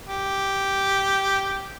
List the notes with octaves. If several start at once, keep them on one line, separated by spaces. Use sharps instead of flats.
G4